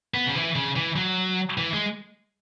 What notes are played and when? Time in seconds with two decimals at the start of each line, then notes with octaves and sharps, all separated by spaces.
0.14 B3
0.26 C#3
0.35 E3
0.55 C#3
0.76 E3
0.96 F#3
1.58 E3
1.74 G#3